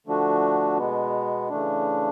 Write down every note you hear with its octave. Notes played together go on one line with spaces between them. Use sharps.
D3 F3 A3 D4 F#4
B2 G#3 B3
C#3 E3 A3 D4